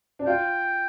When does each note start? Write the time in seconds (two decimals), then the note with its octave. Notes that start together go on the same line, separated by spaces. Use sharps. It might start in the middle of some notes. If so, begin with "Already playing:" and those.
0.19 D4
0.26 F4 G5